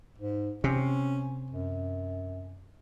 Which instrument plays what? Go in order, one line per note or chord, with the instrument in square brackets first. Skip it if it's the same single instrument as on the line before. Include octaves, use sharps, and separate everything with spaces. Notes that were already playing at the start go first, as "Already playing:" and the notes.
[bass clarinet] G#2
[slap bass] C3 [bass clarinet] C#4
[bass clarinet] F#2